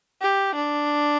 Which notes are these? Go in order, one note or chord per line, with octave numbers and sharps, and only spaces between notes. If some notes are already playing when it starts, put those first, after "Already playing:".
G4
D4